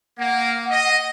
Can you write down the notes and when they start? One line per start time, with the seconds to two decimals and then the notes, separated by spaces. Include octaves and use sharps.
0.19 A#3 F#5
0.70 D#5